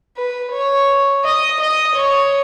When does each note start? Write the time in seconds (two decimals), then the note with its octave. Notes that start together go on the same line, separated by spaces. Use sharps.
0.16 B4
0.52 C#5
1.24 D#5
1.60 D#5
1.96 C#5